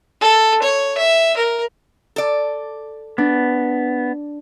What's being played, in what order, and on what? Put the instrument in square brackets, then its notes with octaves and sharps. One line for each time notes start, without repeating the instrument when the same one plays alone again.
[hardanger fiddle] A4
C#5
E5
A#4
[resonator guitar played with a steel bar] A4 D5
[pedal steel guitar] B3 [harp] D4